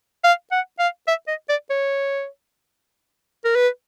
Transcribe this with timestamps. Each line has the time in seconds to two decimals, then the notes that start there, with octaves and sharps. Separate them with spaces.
0.24 F5
0.52 F#5
0.79 F5
1.07 E5
1.28 D#5
1.49 D5
1.70 C#5
3.45 A#4
3.56 B4